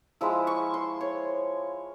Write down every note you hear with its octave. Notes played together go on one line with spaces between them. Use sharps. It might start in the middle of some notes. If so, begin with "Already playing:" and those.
F3 G#3 E4 E6
C#6
C6
C#5